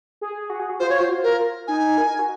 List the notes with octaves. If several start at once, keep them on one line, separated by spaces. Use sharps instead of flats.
G#4
F#4
G#4
F#4
F4 C5
C#5
F#4 C5
F4
A#4
D#4 G#5
A#4
F#4